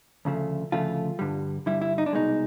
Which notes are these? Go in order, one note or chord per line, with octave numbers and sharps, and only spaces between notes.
D2 C#3 F3 A3
D2 C#3 F3 A3 F4
G2 D3 G3
G2 D3 G3 E4
E4
D#4
D4
C2 B2 G#3 D#4